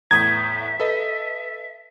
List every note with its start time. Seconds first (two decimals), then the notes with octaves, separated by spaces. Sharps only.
0.11 E2 A2 E5 A#5 D#6 G6 G#6
0.80 A4 B4 D#5